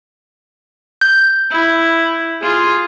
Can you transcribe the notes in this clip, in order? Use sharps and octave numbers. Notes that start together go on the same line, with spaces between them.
G6
E4
F4 G#4